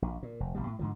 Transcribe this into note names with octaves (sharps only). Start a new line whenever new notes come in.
A#1
A#2
F1
A1 B2 G3
A2
G#2 D3 F3